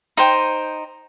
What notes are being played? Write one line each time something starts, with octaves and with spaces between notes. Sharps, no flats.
D#4 C5 G5